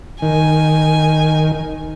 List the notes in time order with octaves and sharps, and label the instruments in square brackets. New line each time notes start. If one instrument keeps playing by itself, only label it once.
[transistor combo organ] D#3 [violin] G#5